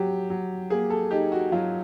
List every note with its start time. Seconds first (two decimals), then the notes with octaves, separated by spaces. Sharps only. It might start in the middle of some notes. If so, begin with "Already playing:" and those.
Already playing: F#3 G4
0.30 F#3
0.70 A#3 G#4
0.90 A4
1.11 D#4 G4
1.32 F#4
1.52 F#3 F4